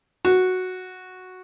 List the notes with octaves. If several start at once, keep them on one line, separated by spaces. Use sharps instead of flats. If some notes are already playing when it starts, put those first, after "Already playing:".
F#4